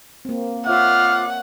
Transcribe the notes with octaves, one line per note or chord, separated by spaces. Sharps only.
A#3 C4
F4 C#5 E5 F#5 D6 F6